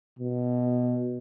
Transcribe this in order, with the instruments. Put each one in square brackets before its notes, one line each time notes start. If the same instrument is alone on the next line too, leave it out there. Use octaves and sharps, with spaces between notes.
[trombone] B2